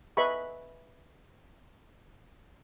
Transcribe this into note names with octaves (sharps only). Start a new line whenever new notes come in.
B4 D#5 E5 G#5 B5 C#6